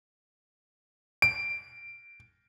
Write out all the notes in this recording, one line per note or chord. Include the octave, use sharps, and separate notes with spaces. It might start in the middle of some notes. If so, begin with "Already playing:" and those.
D7